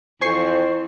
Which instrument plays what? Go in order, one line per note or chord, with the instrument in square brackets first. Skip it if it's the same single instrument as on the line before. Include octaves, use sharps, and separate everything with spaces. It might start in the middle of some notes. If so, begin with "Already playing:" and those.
[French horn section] F2 [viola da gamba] E3 [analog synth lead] C5 [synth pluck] G#5 C#6 C7